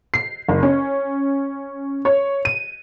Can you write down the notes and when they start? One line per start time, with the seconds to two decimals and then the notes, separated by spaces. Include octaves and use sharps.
0.14 C7
0.48 F#1
0.63 C#4
2.05 C#5
2.45 D#7